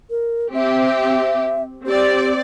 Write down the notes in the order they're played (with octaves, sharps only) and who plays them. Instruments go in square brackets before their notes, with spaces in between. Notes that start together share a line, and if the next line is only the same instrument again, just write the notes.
[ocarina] A#4
[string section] C4 G4 [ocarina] E5
[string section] C4 D5 [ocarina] G4